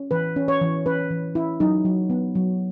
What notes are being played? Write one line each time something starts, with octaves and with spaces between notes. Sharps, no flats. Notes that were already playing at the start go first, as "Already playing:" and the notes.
Already playing: C#4
E3 B4
C#4
C#5
E3
C#4 B4
E3
C#4 E4
F#3 D#4
F#3
B3
F#3